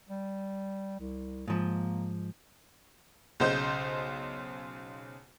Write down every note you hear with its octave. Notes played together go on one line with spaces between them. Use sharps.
G3
C2
G#2 F3 A#3
B1 C#3 C5 D#5 G6